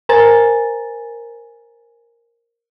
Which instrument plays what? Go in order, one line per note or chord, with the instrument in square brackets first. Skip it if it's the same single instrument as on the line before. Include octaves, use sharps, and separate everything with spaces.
[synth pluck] A#4 C5 G#5 A#5 A6